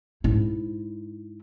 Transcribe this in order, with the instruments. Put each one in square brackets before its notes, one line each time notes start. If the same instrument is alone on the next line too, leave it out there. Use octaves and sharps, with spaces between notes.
[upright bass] G#2 E4